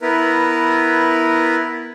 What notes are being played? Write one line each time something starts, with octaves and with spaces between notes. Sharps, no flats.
B3 E4 A#4 B4